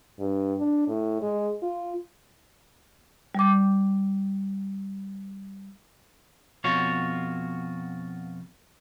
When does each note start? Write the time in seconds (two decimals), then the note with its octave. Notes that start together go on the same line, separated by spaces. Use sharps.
0.19 G2
0.59 D4
0.88 A2
1.22 G#3
1.63 F4
3.35 G3 D6
6.64 F2 B2 F4 F#4 C#5